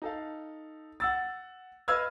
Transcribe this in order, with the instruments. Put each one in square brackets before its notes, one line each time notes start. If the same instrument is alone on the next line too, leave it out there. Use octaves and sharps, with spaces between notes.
[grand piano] D#4 A4 F5
F#5 E6 A6
B4 D#5 F5 E6 F6 G#6